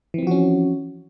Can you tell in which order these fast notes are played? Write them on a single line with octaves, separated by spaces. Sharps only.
E3 C4 F3 F#4 C#4